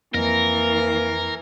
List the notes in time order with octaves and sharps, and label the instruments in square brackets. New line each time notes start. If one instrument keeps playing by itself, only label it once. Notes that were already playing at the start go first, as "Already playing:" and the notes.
[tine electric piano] F2 [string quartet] E3 [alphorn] A#3 [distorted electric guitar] A#4